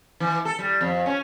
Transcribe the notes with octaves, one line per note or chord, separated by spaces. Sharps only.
E3
A4
G3
F2
C#4